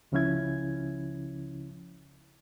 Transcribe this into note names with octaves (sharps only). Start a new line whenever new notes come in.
C#2 C#3 F3 C#4 E4 G#6